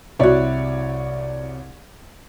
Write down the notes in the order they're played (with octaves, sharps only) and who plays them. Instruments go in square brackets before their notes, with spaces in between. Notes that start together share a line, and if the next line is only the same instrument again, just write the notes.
[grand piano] C2 C#5 D5 [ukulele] E4 F#4